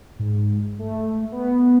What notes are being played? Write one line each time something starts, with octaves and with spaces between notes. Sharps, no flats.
G#2
A3
B3